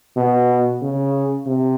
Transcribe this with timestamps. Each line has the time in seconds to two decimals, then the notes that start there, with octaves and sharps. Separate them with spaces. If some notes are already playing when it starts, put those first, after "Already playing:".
0.17 B2
0.82 C#3
1.47 C3